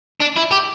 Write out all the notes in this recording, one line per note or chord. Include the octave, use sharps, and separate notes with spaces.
D4
E4
G4